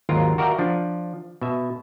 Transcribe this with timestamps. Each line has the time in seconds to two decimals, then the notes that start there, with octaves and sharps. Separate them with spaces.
0.09 G#1 D#2 F#3 F4 A#4 A#5
0.38 F#4 A#4 D5 E5 F5 G5
0.59 F3 D4
1.41 B2 E5